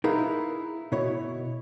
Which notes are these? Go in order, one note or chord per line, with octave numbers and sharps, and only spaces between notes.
D#4 E4 G#4 A#4 B4 F5
B2 E4 C#5